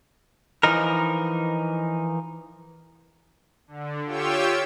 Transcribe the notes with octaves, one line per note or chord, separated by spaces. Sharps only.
E3 F3 D#4 A#4
D3
F4 G4 C#5 G5 E6